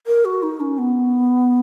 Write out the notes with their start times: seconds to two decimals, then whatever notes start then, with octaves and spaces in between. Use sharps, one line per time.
0.07 A#4
0.25 F#4
0.43 D#4
0.60 C#4
0.78 B3